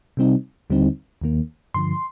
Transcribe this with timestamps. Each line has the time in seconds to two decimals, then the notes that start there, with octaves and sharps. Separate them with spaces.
0.17 C3 G3 C4 D#4
0.70 D#2 D3 G3 C4 D#4
1.21 D#2 D#3 A#3
1.74 G2 D3 F3 C6